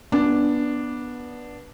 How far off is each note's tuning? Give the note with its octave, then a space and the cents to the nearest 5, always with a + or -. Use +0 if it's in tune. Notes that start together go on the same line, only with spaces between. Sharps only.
B3 -15 D4 +0